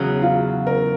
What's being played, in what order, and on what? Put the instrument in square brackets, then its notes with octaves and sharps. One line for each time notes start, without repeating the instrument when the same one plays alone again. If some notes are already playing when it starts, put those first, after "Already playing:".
Already playing: [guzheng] E2 C#3 F#3
[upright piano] F4
A#4